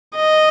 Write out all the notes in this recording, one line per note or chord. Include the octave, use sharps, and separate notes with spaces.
D#5